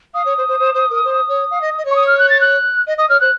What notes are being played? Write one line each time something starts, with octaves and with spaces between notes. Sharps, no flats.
F5 D#6
C#5
C5
C5
C5
C5
A#4
C5
C#5
F5
D#5
D#5
C#5
C#6
D#6
F6
F#6
A6
F#6
D#5
D#5 D#6
C#5 F6
C5 F#6